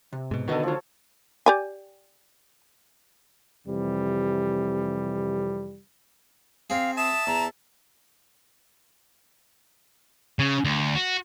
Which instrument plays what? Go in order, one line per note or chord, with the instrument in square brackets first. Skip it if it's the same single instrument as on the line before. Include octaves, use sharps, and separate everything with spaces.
[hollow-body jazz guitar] C3
[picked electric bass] G#2 B2
[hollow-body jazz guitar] B2 B4 D#5 [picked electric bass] D3 D#3 [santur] F#4 A4
[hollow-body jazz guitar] D2 F4 [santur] F3 C#5
[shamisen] G4 D5 G#5
[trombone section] F2 C3 E3 G3
[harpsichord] C4 G#4 [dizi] F5
[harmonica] E5 A5 [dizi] D#6 [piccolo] E7
[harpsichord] E2 [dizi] A#5
[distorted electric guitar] C#3
D2
F#4